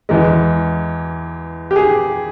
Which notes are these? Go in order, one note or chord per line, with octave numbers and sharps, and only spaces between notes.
E2 E3 G#3
G4
G#4